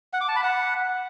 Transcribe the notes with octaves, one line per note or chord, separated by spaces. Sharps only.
F#5
D6
A5
B5
F#5